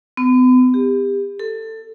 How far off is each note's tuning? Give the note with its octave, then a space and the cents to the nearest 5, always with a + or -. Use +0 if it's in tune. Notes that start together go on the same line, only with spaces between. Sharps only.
B3 +40
G4 +30
A4 +20